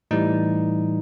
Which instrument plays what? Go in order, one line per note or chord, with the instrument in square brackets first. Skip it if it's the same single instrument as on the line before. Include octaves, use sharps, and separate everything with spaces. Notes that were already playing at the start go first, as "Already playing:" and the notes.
[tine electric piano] A2 E3 G3 D#4